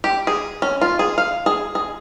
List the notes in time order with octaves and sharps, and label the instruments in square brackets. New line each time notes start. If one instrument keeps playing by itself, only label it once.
[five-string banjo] G4
G#4
C#4
F4
G#4
F5
G#4
G#4